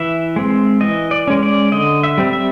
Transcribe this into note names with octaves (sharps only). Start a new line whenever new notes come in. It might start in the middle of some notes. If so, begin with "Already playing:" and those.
Already playing: E3 E5
G#3 C4
E3 D#5
D5
G#3 C#4
D5
D3 D#5
E5
G3 C4
E5